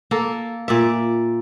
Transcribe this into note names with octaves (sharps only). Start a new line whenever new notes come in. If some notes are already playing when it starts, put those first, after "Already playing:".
A#3 A4
A#2 D5 E5